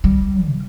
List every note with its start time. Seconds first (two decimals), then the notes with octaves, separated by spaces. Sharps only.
0.04 G3
0.49 B2